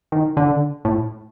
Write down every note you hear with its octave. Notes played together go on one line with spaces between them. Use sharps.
D#3
D3
A2